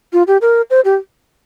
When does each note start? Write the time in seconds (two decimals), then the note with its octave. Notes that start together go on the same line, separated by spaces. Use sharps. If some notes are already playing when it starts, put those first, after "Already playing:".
0.13 F4
0.27 G4
0.41 A#4
0.70 C5
0.85 G4